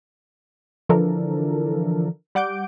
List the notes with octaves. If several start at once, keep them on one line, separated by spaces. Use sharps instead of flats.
D3 E3 F3 D4 A4 A#4
G3 F#5 D6 G6 D7